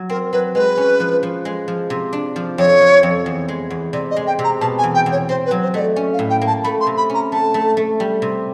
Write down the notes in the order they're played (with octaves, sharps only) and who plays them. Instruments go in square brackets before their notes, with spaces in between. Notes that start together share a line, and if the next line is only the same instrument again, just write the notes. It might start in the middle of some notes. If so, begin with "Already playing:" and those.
Already playing: [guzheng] F#3
[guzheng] C4 [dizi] A#4
[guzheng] F#3 [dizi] B4
[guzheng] G#3 [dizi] B4
[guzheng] C#4
F3
F3
G#3
F3
C3
D4
F3
[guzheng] F2 [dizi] C#5
[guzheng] F3
F2
E2
G#3
E2
[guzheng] C3 [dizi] D5
[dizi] D#5
[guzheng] G#3
[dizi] G5
[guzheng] C3
[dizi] A#5
[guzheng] B2 [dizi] A5
[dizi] G#5
[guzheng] E2
[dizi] G5
[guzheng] E2
[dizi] C#5
[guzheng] C4 [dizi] C5
[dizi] B4
[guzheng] F#3
[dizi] C5
[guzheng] A3 [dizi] D#5
[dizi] D5
[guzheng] C#4
[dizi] F5
[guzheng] A2
[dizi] G5
[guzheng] A#3
[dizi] A5
[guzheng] A3 [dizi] B5
[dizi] C6
[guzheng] C3
[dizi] B5
[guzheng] C#4 [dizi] A#5
[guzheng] A3 [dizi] A5
[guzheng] A3
A3
G3
C3